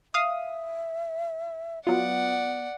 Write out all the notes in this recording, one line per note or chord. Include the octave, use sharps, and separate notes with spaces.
E5 F5 D#6
F#3 B3 F4 D5 F#5